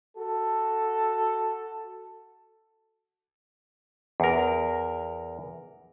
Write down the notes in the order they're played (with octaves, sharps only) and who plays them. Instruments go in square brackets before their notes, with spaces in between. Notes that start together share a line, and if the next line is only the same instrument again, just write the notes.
[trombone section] F#4 A4
[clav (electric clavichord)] E2 A#4